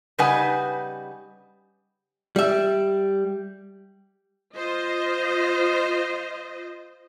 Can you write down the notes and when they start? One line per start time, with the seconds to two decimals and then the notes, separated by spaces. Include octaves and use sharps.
0.18 C#3 G3 D#4 B4 F#5 G#5
2.36 G3 E5
4.55 F4 C5 D#5